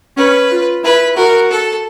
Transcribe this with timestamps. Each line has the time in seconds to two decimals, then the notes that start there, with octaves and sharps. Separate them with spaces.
0.17 C#4 B4
0.51 F4
0.83 E4 B4
1.16 F#4 A#4
1.50 A4